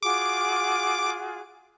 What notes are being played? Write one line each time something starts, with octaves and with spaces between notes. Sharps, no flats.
F4 F#4 G#4 D6